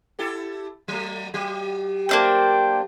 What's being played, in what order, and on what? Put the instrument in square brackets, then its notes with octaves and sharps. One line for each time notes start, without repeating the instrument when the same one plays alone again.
[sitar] E4 G4 A4
F#3 A3
F#3 G4
[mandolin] A#3 D4 C5 [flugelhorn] G5